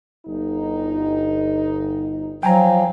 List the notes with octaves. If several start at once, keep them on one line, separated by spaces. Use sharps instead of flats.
G1 D#4
F3 F#3 G5 G#5 A#5